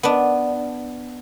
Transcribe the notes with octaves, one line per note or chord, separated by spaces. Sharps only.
B3 D4